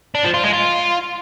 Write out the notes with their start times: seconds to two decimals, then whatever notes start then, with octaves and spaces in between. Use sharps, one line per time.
0.15 D4
0.24 F3
0.34 F4
0.43 G#3
0.53 F4